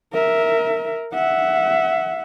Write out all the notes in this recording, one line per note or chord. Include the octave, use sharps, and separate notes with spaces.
A#4 E5
E5 F#5